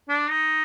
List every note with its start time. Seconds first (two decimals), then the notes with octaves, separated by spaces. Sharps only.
0.09 D4
0.29 D#4